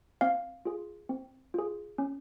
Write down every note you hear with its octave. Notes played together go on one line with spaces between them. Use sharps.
C4 F5
F4 G#4
C4
F4 G#4
C#4